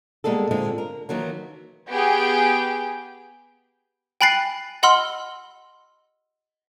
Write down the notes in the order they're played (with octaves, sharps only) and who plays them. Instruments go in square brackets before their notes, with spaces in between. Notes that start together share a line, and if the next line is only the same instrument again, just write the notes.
[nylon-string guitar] B2 G3 G#3 A#3 G#4 A4
A#2 D3 G#3 C4
A#4
D#3 E3 F#3 A#3
[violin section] B3 G4 G#4 G5
[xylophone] G5 G#5 B5 F#6 A6 C7
D#5 F#5 B5 C6 E6 F6